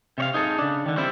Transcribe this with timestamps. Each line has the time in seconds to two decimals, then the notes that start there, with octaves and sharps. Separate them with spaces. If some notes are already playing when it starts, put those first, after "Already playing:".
0.18 C3 C#5 F5
0.34 D#4 G#4 A4
0.58 C#3 D4
0.86 D3 D#3
0.97 G3 C4 E4